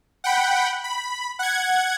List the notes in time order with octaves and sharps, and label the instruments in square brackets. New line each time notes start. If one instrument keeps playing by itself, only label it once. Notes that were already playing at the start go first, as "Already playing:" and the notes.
[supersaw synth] F#5 G5 B5
B5
F#5 G#6